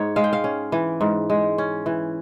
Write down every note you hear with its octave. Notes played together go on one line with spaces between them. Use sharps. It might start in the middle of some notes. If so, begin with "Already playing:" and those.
Already playing: G#2 C#5
G#3 F5
G5
F5
C#4
E3
G#2
G#3
C#4
E3